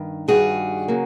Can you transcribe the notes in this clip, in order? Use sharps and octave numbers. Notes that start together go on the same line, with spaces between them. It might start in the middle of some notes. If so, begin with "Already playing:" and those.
Already playing: G2 D#3
G2 D#3 G3 F#4 G#4
C#3 F#3 A#3